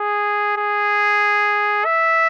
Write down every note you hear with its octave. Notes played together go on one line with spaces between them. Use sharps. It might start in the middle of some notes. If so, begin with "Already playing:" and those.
Already playing: G#4
G#4
E5